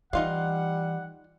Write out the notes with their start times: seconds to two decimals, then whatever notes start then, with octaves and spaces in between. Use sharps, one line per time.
0.13 E3 G3 D#4 F4 F5 F#5